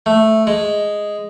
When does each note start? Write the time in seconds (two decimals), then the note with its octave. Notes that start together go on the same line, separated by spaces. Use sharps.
0.06 A3
0.47 G#3